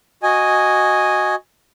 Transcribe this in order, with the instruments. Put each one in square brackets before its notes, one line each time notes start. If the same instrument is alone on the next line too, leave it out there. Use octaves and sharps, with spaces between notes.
[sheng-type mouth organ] F#4 D#5 G#5